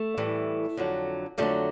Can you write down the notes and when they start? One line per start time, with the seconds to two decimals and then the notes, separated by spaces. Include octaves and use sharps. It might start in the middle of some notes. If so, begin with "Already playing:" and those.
Already playing: A3
0.17 A2 E3 G3
0.77 F2 D3 F#3
1.38 F2 D3 F#3 G3 A3